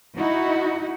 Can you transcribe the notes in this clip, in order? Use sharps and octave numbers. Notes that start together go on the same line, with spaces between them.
D#4 E4 F#4